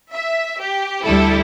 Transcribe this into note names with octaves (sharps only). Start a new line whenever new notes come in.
E5
G4
D2 D3 G3 E4 A4